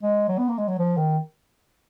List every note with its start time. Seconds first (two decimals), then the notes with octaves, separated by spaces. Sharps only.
0.02 G#3
0.28 F#3
0.38 B3
0.49 A#3
0.58 G#3
0.68 F#3
0.78 F3
0.97 D#3